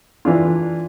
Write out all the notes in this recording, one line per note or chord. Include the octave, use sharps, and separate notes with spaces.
E3 D4 F4